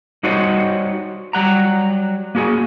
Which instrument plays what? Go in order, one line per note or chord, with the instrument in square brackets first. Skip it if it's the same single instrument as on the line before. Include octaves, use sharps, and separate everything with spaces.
[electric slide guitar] G3 D#4 F#4 C5 C#5
F#3 G3 F#5 A#5
A#3 F#4 G#4